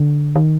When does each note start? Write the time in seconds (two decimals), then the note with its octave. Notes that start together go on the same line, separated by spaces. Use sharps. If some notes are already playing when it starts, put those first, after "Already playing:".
Already playing: D3
0.36 D#3